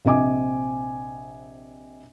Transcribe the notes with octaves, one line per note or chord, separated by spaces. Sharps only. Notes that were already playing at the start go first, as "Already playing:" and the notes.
A#1 C3 C4 D#5 G#5 D6